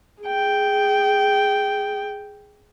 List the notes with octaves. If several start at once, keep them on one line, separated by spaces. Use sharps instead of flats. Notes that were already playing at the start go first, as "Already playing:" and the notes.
G#4 G5